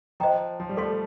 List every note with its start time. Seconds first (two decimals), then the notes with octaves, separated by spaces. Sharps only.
0.20 F3 C5 D#5 G5 A#5
0.60 F3
0.69 G3
0.77 A3 A4 D5 F5 C6